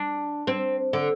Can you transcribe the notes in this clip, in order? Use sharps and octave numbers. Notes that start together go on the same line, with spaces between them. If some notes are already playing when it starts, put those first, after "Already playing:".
Already playing: D4
C4
D3